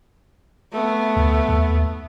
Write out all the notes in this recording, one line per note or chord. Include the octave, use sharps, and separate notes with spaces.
A3 B3
D2
D#2